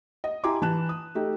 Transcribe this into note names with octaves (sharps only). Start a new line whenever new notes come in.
D#5
E4 G4 G#5 A#5 C6 D6
E3 A5 F#6 E7
D#6
A3 D#4 G4